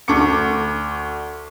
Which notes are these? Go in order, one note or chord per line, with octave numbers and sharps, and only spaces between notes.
D2 C#6 D6 C#7